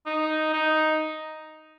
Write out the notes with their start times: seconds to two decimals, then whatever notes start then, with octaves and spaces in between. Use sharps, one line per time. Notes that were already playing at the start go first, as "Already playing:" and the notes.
0.06 D#4
0.54 D#4